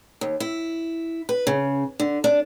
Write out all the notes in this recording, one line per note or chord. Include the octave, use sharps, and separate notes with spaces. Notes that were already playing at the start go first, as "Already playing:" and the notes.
D#2
E4
B4
C#3
D3
D4